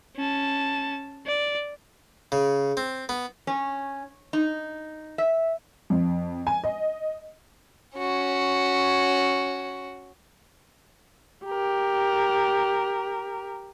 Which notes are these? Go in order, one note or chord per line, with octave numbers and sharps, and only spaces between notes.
C#4 A5
D5
C#3
C4
B3
C#4
D#4
E5
F2
G#5
D#5
C#4 F#4
G4 A#4